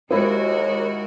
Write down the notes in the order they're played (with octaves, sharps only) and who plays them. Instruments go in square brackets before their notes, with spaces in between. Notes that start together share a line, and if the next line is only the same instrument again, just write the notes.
[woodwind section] D#2 [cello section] G#3 F#4 A#4 [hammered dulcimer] E4 D#5 [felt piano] C5